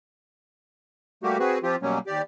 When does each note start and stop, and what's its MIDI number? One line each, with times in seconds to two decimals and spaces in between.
1.23 1.38 55
1.23 1.38 57
1.23 1.38 58
1.23 1.38 66
1.23 1.38 67
1.40 1.59 60
1.40 1.59 66
1.40 1.59 68
1.40 1.59 71
1.63 1.76 53
1.63 1.76 60
1.63 1.76 65
1.63 1.76 67
1.82 1.99 47
1.82 1.99 54
1.82 1.99 55
1.82 1.99 58
1.82 1.99 61
2.07 2.22 39
2.07 2.22 67
2.07 2.22 74